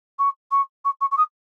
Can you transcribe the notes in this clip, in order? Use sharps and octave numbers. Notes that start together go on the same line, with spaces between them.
C#6
C#6
C#6
C#6
C#6
D#6